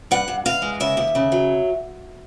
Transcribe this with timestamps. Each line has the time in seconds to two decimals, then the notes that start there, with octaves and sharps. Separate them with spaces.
0.11 G2 F#5
0.28 G2
0.45 E3 F5
0.62 G#3
0.80 C#3 E5
0.97 D#2
1.15 C#3
1.32 F#3